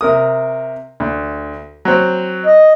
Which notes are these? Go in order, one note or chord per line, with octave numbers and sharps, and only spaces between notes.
C3 A#4 D#6
D2
F#3 C4
D#5